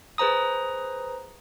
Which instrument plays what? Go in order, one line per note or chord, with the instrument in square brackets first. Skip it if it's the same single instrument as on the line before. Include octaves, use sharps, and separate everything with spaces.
[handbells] G#4 B4 C5 A#5 D#6